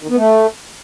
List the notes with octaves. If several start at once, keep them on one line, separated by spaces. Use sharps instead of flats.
D#3
B3
A3